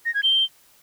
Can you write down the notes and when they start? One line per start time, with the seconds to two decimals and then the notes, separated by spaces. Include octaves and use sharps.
0.05 A#6
0.14 G#6
0.23 G7